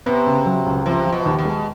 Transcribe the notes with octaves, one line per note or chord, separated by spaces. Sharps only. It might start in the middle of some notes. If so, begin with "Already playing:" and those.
C3 B3
C#3
F#3
C#2
C3 F3
F3
B2
D#2
B2
G#3